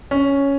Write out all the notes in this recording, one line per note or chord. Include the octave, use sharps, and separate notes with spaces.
C#4